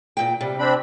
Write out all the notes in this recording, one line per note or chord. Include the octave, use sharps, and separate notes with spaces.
E2 A#2 G5
C3 G3
C4 D4 B5